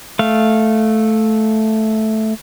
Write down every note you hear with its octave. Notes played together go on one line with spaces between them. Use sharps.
A3 F5